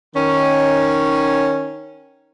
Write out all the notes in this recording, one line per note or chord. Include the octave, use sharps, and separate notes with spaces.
D#3 C#4